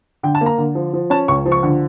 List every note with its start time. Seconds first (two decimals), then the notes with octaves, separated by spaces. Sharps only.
0.23 D3 G5
0.35 A5
0.41 A#3
0.46 A#5
0.58 D3
0.75 F3
0.93 F3
1.10 C#4 A5
1.28 C#2 C#6
1.46 F3
1.52 C#6
1.63 D3